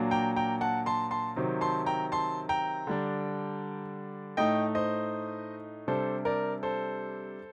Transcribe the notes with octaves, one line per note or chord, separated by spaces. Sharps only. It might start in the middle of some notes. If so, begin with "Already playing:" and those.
Already playing: A#2 F#3 A#3 D4
G5 A#5
G5 A#5
F#5 A5
A5 C6
A5 C6
C3 D#3 F#3 C4
A5 C6
G5 A#5
A5 C6
G5 A#5
D3 G3 D4
A2 A3 D#4 D#5 G5
C5 D#5
C3 G3 D4 A4 C5
A#4 D5
A4 C5